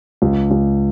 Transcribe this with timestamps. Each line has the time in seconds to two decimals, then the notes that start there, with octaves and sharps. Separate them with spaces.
0.22 C#2
0.51 C#2